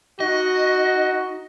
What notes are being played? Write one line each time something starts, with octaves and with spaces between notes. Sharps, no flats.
D#4 F#4 D#5